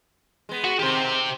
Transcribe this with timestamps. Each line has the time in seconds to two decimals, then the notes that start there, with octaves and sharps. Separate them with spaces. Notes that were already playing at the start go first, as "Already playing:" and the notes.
0.49 G#3 B3
0.64 F#4
0.79 D#3 C4 G4 C5